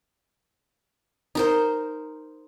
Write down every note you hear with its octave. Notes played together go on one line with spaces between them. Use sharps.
D#4 A#4 C5